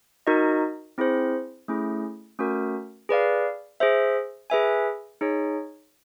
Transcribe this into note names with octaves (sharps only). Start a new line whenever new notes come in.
D#4 F#4 A#4 D#5
C4 E4 G#4 C5
A3 C#4 E4 G#4
A3 C#4 F#4 A#4
G#4 B4 D5 F5
G#4 C5 E5
G#4 B4 E5 G#5
D#4 G#4 C#5